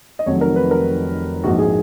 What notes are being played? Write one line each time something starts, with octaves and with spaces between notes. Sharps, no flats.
D#5
F1 F2 D#3 F#3 C#5
A#4
B4
A#4
A#1 G#2 F3 F#4
G#4